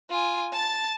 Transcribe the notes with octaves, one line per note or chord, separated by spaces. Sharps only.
F4 G#5
A5 A6